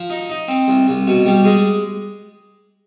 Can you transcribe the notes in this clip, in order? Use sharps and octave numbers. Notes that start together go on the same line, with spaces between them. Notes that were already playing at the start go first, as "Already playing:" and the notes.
Already playing: F3
D#4
D#4
C4
C2
C2
B2
G3
G#3